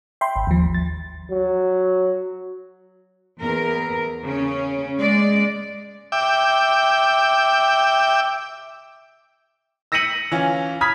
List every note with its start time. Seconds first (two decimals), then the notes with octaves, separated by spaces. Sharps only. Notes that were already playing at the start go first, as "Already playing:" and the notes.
0.21 E5 G5 B5 C6
0.36 G#1
0.47 D#2 F3
0.74 A6
1.31 F#3
3.41 E2 A#4
4.23 C#3 C#4
4.99 G#3 D5
6.12 E5 G5 D6
9.92 E6 A#6 B6 C#7 D#7 F#7
10.32 E3 C#4 F4
10.81 B5 D#6 F6 G#6 B6